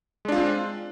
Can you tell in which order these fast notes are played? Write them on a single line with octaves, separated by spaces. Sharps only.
G#3 D4 F4 C4